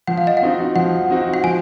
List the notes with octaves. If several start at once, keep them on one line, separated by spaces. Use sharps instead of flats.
F3 F#5
F5
D#5
F5
C4 D#4 F#4
F3 F#5
C4 D#4 F#4
F#5
F3 G#5